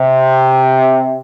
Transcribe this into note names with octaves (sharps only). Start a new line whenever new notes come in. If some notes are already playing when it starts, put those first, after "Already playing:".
Already playing: C3